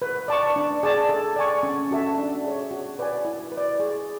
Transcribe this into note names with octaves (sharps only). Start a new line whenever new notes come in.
B4
D5 A5 C#6
D4
G#4 D5 A5
A4
D5 G#5 C#6
C#4
F#4 A4 E5 A5
D4
G#4 C#5
F#4
B4 D5 G#5
E4
B4
D5
G#4